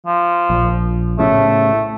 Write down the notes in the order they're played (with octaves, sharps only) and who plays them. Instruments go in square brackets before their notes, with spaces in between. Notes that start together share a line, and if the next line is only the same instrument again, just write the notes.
[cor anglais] F3
[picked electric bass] A#1
[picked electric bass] A2 C#3 [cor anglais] A3